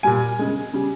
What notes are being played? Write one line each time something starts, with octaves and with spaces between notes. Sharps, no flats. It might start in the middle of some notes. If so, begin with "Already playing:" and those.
A#2 G3 G#5
C#3 G#3
C#3 G3